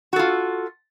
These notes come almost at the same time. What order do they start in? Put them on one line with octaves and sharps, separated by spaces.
F#4 A4 F4